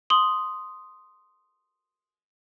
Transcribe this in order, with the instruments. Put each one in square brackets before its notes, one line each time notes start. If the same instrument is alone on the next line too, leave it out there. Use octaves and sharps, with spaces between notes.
[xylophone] C6 D#6 F#7 G7